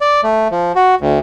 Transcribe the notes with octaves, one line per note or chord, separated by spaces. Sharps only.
D5
A3
F3
F#4
D2